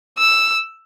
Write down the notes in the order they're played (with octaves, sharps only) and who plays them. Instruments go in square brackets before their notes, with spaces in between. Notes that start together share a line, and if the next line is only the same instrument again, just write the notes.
[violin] E6